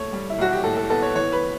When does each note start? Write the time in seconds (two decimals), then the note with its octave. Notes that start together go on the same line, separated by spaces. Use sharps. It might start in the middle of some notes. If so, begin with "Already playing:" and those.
Already playing: A3 C#5
0.13 G3
0.30 E4
0.38 B1 F#4
0.52 G4
0.64 A2 A4
0.77 A4
0.90 B3 A4
1.02 C#5
1.15 E3 C#5
1.32 B4